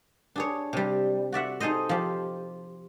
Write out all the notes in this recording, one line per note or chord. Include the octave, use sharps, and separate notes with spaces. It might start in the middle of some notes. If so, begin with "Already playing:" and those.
D4 G#4 C#5
C3 G3
F#4 D5 E5 F#5
D#4 G#4 A4 C5 D#5
F3 G4